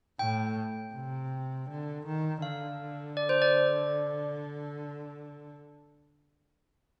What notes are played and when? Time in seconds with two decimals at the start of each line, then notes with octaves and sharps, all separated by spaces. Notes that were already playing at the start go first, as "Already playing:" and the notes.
0.19 A2 G5
0.94 C3
1.69 D3
2.06 D#3
2.42 D3 F5
3.17 D5
3.29 C5
3.42 D5